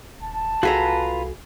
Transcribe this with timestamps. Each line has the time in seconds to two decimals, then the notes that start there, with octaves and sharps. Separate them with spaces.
0.21 D#1 A5
0.63 C2 F4 F#4 G#4 A4 B4 A#5